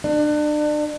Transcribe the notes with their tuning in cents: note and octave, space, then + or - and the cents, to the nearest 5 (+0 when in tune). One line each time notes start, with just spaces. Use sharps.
D4 +35